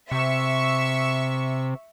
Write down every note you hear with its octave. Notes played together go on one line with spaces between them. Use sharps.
C3 E5 C#6 E6